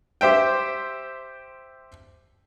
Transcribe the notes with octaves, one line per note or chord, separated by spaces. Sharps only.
G4 C5 E5 G5